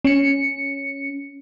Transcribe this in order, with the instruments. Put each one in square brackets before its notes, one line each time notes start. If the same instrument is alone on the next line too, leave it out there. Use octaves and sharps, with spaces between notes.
[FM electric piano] C#4 C#7